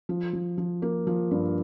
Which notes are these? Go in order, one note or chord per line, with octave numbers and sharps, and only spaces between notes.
F3
F3
F3
A#3
F3
G2